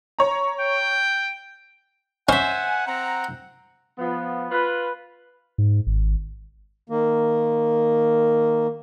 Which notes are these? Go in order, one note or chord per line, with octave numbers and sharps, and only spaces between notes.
C#5 A#5
G5
C#4 C5 E5 F#5 G#5
C4 F#5 A#5
F3 B3
F4 B4
G#2
G#1
D#3 A#3